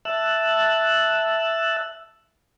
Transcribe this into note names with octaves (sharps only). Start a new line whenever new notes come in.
E5 A5 E6 F#6